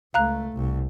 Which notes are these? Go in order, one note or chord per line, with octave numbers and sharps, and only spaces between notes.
C#2 A3 F5 A#5 F#6
C2